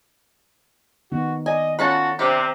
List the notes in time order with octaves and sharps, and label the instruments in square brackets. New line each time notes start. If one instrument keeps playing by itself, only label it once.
[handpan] D#3 B3 D#4 [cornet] F#4
[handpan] D5 [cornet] D#5 [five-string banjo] G#5
[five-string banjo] C#4 A5 B5 [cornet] F4 [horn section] F#4 A4 F#5
[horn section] C3 [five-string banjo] D4 G4 [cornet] A#5